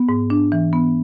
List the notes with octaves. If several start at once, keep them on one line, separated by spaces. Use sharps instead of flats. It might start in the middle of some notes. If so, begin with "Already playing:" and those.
Already playing: B3
G#2
D4
E3
B3